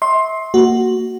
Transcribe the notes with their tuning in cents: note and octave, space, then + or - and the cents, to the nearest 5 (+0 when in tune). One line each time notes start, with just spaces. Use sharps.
E5 -35 C6 +15
A#3 -10 F#4 +5